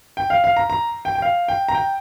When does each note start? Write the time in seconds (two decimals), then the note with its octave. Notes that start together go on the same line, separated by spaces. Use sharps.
0.17 G5
0.30 F5
0.44 F5
0.57 A#5
0.70 A#5
1.05 G5
1.15 G5
1.22 F5
1.48 G5
1.68 A#5
1.75 G5